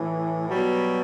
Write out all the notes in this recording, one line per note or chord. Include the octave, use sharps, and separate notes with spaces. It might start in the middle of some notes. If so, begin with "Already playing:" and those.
Already playing: A2 E3
B2 F#3 G3